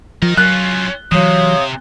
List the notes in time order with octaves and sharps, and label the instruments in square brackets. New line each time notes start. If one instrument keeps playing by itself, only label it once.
[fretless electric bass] F3 [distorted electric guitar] D#4 A#4
[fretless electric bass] F#3 [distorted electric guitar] C#4 F4 [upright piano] F#6
[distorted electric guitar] C3 [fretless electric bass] E3 F#3 [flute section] C#5 F5 D#6